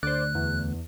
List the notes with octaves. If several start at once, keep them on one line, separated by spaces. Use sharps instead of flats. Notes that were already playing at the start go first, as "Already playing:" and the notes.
D2 C5 D5 F#6
E2